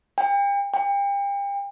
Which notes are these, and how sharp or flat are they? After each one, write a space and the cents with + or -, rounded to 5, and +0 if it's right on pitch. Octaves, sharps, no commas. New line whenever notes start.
G5 +40
G5 +35